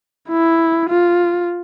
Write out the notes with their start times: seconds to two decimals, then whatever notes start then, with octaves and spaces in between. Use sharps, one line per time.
0.29 E4
0.90 F4